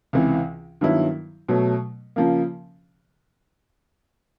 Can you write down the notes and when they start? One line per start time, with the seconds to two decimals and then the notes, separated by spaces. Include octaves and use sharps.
0.13 C#2 C3 E3
0.81 G2 D#3 F#3 B3 E4
1.49 B2 F#3 A3
2.16 C#3 F3 A#3